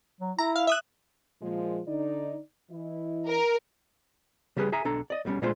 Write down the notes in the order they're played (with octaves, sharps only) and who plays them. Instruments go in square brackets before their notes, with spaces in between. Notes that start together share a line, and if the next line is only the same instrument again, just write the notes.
[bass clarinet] F#3
[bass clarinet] E4 [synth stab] A#5
[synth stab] F5
E5 D#6 F#6
[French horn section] A#2 F3 G#3
D3 D#4 D5
E3 E4 D#5
[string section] A#4
[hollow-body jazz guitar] C#3 G3 G4 G#4 B4
G#4 E5 G#5 A#5
B1 D4 A4 A#5
D5 D#5
B1 B2 G3 C#4
A#2 D3 G#3 A3 F4 C5